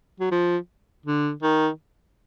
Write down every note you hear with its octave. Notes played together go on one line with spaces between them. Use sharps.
F#3
F3
D3
D#3